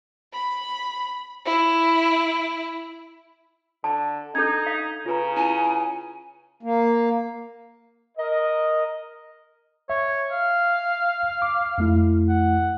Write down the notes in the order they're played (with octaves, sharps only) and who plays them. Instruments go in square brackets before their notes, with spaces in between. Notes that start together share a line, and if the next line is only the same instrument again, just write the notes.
[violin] B5
E4
[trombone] D3 [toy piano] A5
[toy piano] D4 A4 [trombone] D#4 [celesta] G6 G#6
[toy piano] F5
[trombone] C#3 [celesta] F4 B4 A#5
[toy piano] E4 [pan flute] G#5
[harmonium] A#3
[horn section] A#4 D#5
[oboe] C#5 [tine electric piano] E5
[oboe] F5
[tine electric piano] D6
F2 A3 E4
[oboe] F#5